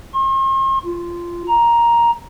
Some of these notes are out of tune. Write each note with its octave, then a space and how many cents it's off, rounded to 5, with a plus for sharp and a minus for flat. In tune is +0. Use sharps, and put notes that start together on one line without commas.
C6 +45
F4 -15
A#5 +10